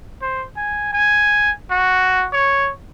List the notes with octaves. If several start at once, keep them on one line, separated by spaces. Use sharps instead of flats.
C5
G#5
G#5
F#4
C#5